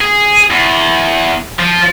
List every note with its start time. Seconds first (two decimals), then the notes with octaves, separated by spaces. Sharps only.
0.01 G#4
0.51 E2
1.60 F3